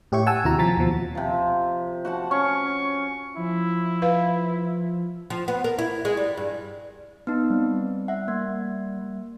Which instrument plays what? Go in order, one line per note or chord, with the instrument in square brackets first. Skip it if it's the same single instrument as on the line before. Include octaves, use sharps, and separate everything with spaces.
[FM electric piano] A2 G4 C#5 E5 C#6
F#5 G#5 A5 E6
D#2 C3 E4 F#4 A#5
C3 F3 A#5 A6 B6
D#2 B2 F3
[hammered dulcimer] C3 F3
F#4 F#5 A5
[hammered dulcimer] C#4 [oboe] C#6
[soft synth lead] F3 [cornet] E4
[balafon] B4 F5
[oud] F3
B3
A#4
E4
G#3
G3
G2
[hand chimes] B3 D#4
[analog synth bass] G3 [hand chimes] C4
[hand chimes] E5 F#5
A#3